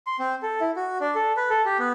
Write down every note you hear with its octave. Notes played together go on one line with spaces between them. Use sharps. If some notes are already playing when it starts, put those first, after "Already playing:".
C6
C4
A4
E4
F#4
D4
A4
B4
A4
G4
B3